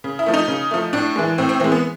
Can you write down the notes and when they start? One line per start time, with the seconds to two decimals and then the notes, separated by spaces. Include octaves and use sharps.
0.04 C#3
0.19 E4
0.26 F3 A3
0.34 D#4
0.48 C#3
0.71 F3 A3
0.93 A2 D4
1.16 E3 G#3
1.38 A2 C4
1.49 C4
1.60 E3 G#3 C4
1.72 B3